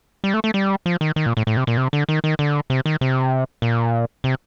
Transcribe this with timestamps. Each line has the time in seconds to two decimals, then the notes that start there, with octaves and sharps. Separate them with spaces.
0.24 G3
0.34 A3
0.44 A3
0.54 G3
0.86 F3
1.01 D#3
1.16 D#3
1.26 A#2
1.37 A2
1.47 A2
1.57 C3
1.67 A#2
1.77 C3
1.93 D3
2.09 D#3
2.24 D#3
2.39 D3
2.70 C3
2.86 D#3
3.01 C3
3.62 A#2
4.24 C3